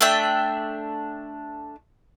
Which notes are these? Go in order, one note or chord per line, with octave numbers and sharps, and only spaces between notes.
A3 D4 E5 G5